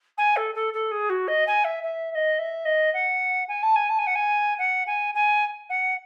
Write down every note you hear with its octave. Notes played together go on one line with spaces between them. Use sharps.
G#5
A4
A4
A4
G#4
F#4
D#5
G#5
E5
E5
E5
D#5
E5
D#5
F#5
G#5
A5
G#5
A5
G#5
F#5
G#5
F#5
G#5
G#5
F#5